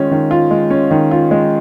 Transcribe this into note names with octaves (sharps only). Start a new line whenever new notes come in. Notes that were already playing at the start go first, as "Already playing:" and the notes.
Already playing: D#3 G#3 C#4 F4
D#3
F4
G#3
C#4
D#3
F4
G#3